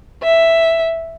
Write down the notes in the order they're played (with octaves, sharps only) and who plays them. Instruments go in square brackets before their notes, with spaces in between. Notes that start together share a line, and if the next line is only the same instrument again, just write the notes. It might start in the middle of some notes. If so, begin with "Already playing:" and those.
[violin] E5